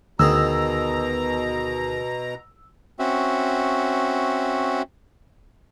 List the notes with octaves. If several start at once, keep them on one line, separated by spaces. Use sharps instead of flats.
D2 G#2 B2 D#3 G#4 A#5 E6
C4 C#4 F#4 E5